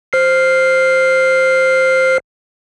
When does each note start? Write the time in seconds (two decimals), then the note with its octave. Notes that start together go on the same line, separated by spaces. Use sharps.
0.13 C5 F6 C7